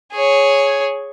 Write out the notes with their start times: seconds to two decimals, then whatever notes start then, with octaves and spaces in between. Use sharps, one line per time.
0.13 G#4 C#5